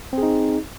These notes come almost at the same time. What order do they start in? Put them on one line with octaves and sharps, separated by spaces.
C4 G#4 D#4